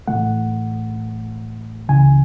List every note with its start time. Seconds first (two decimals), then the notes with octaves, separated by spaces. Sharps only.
0.07 A2 E3 A3 F#5
1.89 C#2 C#3 E3 G#5